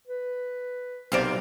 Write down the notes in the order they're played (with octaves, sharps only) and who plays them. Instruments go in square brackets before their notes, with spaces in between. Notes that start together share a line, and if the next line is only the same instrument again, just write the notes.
[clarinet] B4
[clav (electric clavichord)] B1 C3 D5 [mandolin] A#4 C5 F5